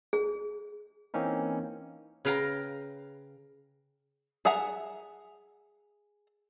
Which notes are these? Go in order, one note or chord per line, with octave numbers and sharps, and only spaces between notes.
G#4
E3 A#3 C4 C#4 D#4
C#3 B4 F5 G5 A#5
G#4 E5 F#5 A#5